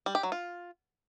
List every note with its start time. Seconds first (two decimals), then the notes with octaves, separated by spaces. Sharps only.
0.06 G3
0.15 G4
0.23 F#3
0.32 F4